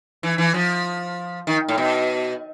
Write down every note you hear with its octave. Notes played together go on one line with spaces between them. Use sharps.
E3
E3
F3
D#3
A2
B2